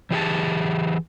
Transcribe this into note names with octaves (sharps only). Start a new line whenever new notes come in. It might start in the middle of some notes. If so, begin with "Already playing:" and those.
E3 G4 G#4 A5